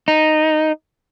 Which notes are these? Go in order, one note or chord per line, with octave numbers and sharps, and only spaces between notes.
D#4